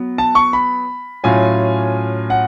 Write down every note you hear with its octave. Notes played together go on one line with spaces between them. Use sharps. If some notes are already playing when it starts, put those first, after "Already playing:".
Already playing: F#3 B3
A5
C#6
B5
A2 F#3 C#4 F4 G#5
F#5